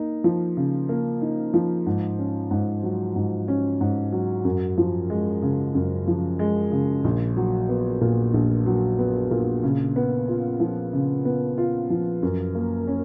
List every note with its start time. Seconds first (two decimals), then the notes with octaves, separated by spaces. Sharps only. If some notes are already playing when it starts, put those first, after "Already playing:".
Already playing: A#3 D#4
0.24 F3
0.57 C#3
0.89 A#3
1.22 D#4
1.54 F3
1.86 G#2
2.19 C#4
2.51 G#2
2.83 F#3
3.16 G#2
3.48 C#4
3.81 G#2
4.12 F#3
4.45 F#2
4.78 F3
5.10 G#3
5.42 C#3
5.75 F#2
6.07 F3
6.39 G#3
6.72 C#3
7.04 A#1
7.37 F#3
7.69 B3
8.01 A#2
8.34 A#1
8.66 F#3
8.99 B3
9.31 A#2
9.63 C#3
9.96 B3
10.28 F4
10.60 F3
10.93 C#3
11.25 B3
11.58 F4
11.90 F3
12.23 F#2
12.55 A#3
12.87 C#4